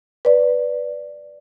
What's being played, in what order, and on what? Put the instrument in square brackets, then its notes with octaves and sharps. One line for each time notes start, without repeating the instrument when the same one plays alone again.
[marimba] B4 D5